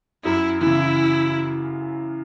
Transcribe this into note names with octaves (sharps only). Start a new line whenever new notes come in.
F#2 E4
C#3 E3 E4